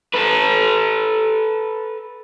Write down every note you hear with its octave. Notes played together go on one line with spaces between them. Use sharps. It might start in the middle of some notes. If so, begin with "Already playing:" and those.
A4 B4